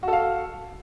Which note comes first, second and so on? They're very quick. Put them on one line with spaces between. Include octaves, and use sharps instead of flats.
F#4 A4 F5